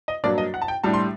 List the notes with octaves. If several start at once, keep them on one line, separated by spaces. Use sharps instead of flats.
D#5
G2 F#3 A#3 D4 D5
D#5
F#5
A5
G5
A2 G3 D4 A5
C6